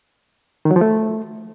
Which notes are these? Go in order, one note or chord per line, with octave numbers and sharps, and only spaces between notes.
D#3
F#3
F3
A3